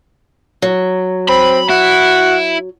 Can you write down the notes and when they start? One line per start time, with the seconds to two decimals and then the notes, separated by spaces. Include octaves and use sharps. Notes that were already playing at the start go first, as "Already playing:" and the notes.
0.62 F#3
1.29 C4 B5
1.69 E4 F#4